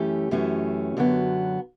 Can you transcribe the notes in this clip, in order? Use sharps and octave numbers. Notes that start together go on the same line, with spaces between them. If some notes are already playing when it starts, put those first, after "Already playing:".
Already playing: F#2 E3 A3 C#4 G4
F#2 E3 A3 C#4
F#2 D3 F#3 B3